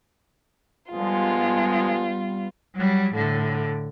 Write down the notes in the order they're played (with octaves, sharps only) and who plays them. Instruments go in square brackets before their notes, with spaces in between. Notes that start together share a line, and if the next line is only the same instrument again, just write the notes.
[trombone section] D3 F3 G#3 [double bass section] G3 B3 [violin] F4
[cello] F#3 G3
A2 D3